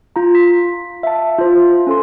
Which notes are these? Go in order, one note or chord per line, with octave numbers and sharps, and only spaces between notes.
F4 A#5
B6
E5 F5 A5
F4 C5
C#4 A4 C6